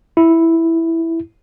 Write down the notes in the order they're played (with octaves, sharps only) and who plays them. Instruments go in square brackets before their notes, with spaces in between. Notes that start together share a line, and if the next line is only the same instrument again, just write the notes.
[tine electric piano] E4